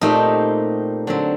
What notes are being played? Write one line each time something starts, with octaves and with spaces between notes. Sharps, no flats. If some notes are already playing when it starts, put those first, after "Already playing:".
A#2 A3 C4 D#4 G4
D3 F#3 C4